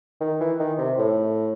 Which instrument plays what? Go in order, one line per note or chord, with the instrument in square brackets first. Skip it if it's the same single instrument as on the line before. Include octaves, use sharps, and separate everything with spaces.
[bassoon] D#3
E3
D#3
C3
A2